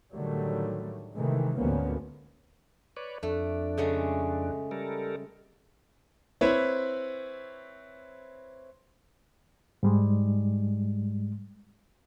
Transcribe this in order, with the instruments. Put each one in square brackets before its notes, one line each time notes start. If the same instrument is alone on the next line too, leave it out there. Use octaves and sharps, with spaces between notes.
[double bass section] A2 D3 D#3 F#3 G3 A3
C3 D#3 E3 G#3 A3
D2 G#2 F3 A#3 B3 C#4
[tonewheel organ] B4 C#5 D5
[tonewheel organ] F2 D4 [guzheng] A3
[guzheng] C#3 G#3 A3
[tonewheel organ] G3 A4 A#4
[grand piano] C4 E4 B4 C#5
[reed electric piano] G#2 G3 G#3